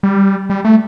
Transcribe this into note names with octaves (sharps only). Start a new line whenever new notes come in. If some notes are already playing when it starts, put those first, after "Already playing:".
G3
G3
A3